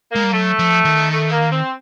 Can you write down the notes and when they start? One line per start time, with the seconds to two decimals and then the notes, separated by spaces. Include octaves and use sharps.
0.12 G#3 A#3
0.24 G3
0.32 F#3 A3
0.59 F3
0.85 D#3
1.11 A3
1.31 A#3
1.51 C4